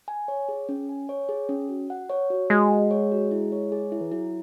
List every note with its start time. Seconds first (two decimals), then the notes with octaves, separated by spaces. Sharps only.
0.08 G#5
0.28 C#5
0.49 G#4
0.69 C#4
0.89 G#5
1.09 C#5
1.29 G#4
1.49 C#4
1.69 F#4
1.90 F#5
2.10 C#5
2.30 F#4
2.50 G#3 F#4
2.71 F#5
2.91 C#5
3.12 F#4
3.31 E4
3.52 C#5
3.72 G#4
3.92 E4
4.01 E3
4.11 F#3 E4